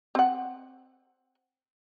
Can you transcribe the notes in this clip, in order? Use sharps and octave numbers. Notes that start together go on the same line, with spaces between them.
C4 F#5